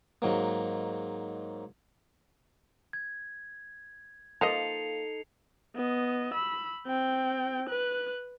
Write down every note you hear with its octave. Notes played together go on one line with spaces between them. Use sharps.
G#2 F#3 A#3
G#6
F3 A#3 D#4 A4 D#5 C7 C#7 F7
B3 D#5
B5 E6
C4 G5
B4 F#6